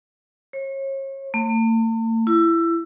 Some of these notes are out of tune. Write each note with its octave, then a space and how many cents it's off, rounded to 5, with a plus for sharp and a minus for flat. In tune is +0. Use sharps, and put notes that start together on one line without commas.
C#5 -35
A3 +45
E4 +20